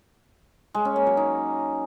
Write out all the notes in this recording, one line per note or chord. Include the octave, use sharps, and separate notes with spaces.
G#3
C#4
A#3
F#3
D#4